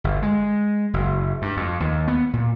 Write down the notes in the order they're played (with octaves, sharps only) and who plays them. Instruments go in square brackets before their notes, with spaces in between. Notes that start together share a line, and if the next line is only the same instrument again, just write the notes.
[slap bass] G1
G#3
F#1
G2
F2
D#2
B3
A#2